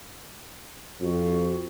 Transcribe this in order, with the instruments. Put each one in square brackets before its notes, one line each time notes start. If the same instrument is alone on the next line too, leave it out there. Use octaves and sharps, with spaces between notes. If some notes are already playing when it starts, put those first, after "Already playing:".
[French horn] F2 [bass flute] F#4